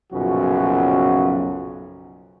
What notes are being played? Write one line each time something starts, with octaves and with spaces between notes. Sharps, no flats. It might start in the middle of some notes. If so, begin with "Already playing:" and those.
B1 F#2 A#2 C#3 F3 F#4